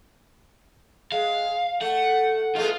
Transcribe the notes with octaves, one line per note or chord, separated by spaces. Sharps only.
G#3 F5
A3 F#5
G#3 A3 B3 F4